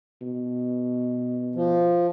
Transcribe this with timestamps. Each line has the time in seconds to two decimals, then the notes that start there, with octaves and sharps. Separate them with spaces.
0.22 B2
1.56 F3